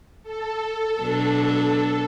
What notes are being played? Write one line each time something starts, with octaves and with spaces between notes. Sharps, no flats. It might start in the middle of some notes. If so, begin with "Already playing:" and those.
A4
B2 F#3 D4